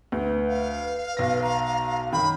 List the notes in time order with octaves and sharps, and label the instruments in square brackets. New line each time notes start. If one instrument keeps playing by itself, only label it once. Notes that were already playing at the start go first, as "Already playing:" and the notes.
[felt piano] D2 [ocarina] B4
[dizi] F5
[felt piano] B1 A#6 [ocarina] B4
[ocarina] A#5
[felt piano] F#2 D#3 [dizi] B5